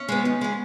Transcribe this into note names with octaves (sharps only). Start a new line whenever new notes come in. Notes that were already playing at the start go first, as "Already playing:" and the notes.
Already playing: C#4
G#3 B3
D#3
G#3 B3